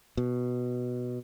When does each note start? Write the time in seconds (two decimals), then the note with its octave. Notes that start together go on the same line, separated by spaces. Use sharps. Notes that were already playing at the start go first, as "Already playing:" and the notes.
0.17 B2